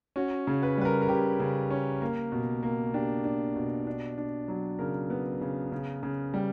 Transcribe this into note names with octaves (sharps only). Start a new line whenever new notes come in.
C#4 F#4
C#3
B4
G3 B4
A#4
A#4
C#3 G4
C#3
C#4
A#3
B2
A#3
D4 G4
D4
B2
D4
D4
F#3
C#3 A#4
B3
C#3
C#3
C#3
G3